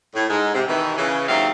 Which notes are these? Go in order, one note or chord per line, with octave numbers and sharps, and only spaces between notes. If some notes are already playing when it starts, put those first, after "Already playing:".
A2
G#2 G#3
C3
B2 D#3 E3
C#3 E3
D#2 G#2 F#3 C4 E5 F5